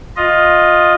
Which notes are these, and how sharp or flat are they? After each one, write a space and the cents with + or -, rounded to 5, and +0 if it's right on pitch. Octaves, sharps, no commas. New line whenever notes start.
F4 +15 D#5 +0